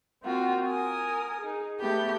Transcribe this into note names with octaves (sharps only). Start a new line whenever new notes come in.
A#3 C4 F4 F#4
A#4 G#5 D#6
D#4 G#4
A3 B3 G4 G6